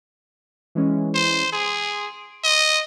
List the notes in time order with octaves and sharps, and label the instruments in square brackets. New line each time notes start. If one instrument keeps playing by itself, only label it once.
[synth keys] E3 G#3 C#4
[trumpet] C5
[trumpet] G#4 [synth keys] C6 D7
[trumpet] D#5